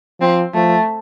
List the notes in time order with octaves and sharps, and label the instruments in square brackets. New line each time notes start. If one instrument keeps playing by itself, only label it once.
[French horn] F3 [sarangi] C4
[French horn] F3 [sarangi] A3